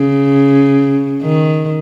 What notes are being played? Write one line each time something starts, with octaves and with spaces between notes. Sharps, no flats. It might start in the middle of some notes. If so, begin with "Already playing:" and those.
Already playing: C#3
D#3